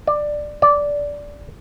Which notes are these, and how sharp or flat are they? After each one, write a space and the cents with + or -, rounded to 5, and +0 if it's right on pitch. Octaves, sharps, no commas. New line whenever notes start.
D5 +15
D5 -10